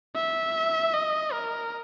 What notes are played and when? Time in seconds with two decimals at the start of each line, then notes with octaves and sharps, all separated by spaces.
0.16 E5
0.94 D#5
1.33 A#4